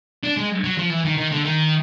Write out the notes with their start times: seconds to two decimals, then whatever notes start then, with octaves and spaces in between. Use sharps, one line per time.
0.23 D4
0.37 G#3
0.64 F#3
0.78 F3
0.90 E3
1.05 D#3
1.17 D#3
1.31 D3
1.45 D#3